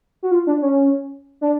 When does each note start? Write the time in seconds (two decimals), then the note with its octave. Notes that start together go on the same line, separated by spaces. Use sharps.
0.23 F#4
0.31 F4
0.47 D4
0.62 C#4
1.41 D4